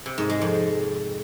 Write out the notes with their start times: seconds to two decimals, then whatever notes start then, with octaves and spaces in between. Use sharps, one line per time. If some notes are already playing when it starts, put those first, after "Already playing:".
0.06 C3
0.18 G#2
0.30 G#3
0.41 F2